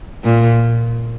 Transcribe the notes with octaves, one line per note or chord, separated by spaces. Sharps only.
A#2